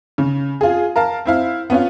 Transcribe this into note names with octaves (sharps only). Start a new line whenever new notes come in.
C#3
F4 G#4
A#4 F5 A5
C4 E4 F5
B3 C#4 F4